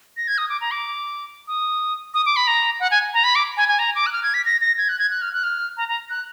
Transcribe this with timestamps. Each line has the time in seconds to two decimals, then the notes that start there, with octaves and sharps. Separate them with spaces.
0.17 A#6
0.28 G#6
0.38 D#6
0.49 D6
0.61 A#5
0.71 D6
1.48 D#6
2.14 D#6
2.26 D6
2.36 B5
2.47 A#5
2.80 F#5
2.91 G#5
3.13 A#5
3.24 B5
3.35 D6
3.57 G#5
3.68 G#5
3.79 A#5
3.95 D6
4.06 F#6
4.12 F6
4.23 G#6
4.34 B6
4.45 A#6
4.61 A#6
4.78 G#6
4.89 F#6
4.99 G#6
5.11 F#6
5.22 F6
5.33 F#6
5.44 F6
5.77 A#5
5.88 A#5
6.10 F#6